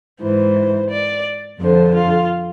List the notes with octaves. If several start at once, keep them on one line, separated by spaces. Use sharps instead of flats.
G#2 E3 C5
D5
F2 D3 C5
F4